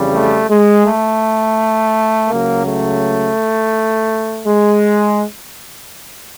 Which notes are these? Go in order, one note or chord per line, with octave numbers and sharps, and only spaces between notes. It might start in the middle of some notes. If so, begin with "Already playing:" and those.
Already playing: F2 C#3 E3 G3
A3
G#3
A3
C#2 C#3 F#3 A#3
A3
G#3